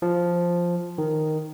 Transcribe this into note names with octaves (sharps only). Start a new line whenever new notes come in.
F3
D#3